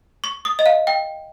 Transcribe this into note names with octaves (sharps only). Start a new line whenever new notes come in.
C#6
D#6
D#5
F5
G5